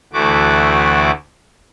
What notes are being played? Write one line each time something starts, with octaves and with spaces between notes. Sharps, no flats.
D2 E3 A3 F#4 D6